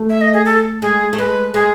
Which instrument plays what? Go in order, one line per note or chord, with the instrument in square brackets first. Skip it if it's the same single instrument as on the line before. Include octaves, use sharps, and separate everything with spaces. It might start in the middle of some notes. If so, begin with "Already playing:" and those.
Already playing: [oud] A3
[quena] E5
D#5
G#4
A4
[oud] G#3 [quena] G#4
[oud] A3
[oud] G#3 [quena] B4
[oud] G#3 [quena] G#4